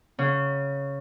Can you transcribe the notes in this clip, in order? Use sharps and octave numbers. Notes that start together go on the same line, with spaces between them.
C#3